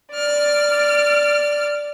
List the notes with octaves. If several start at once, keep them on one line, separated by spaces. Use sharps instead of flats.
D5 F6